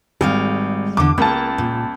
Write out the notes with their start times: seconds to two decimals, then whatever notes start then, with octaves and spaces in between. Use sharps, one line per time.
0.21 G#1 G3 G#3 F5
0.97 E2 D3 D6
1.18 C#2 A#3 A5
1.58 A#2